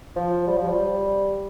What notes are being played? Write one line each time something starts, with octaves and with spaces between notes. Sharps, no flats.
F3
G3
F3
G3